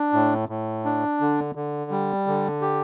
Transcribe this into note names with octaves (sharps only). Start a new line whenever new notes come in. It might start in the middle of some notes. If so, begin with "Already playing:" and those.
Already playing: D4
A2
A2
D4
D3
D3
G3
D3
G4